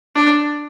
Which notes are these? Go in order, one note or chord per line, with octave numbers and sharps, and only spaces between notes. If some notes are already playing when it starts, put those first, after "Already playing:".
D4